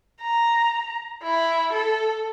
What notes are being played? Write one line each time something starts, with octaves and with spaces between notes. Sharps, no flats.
A#5
E4
A4